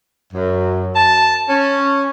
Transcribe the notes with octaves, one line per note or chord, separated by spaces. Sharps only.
F#2
A5
C#4